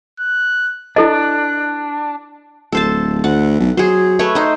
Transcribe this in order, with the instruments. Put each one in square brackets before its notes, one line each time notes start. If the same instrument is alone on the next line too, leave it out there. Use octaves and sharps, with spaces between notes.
[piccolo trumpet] F#6
[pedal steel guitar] D4 [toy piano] E4 A4 D#5 [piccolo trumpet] F#6
[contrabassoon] D1 [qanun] A4 C5 A5
[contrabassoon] D2 [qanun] F#5
[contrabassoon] B1
[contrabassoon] F#3 [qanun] G#4 C5
[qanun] A3 B4 C#5
D#4 C5